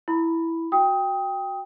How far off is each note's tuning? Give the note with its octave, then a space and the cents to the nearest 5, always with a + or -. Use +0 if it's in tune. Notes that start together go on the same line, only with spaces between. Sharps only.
E4 +0 B5 +0
F#4 +0 G5 +10 D#6 +20